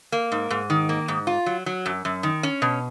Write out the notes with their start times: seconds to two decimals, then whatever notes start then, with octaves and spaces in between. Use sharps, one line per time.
0.12 A#3
0.32 G#2
0.50 G#2
0.70 D#3
0.89 A#3
1.08 G#2
1.27 F4
1.46 F#3
1.66 F#3
1.86 F#2
2.05 F#2
2.23 D#3
2.43 C#4
2.62 B2